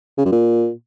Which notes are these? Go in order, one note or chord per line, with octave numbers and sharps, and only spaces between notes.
C#3
F#2
A#2